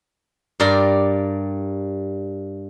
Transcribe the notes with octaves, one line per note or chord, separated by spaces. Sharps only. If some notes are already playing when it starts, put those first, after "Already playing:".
G2 G3 A#4 D5 C6